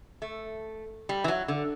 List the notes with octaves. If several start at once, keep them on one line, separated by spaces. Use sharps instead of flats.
A3
G3
E3
F#3
D3